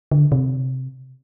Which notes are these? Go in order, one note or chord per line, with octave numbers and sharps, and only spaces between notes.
D3
C3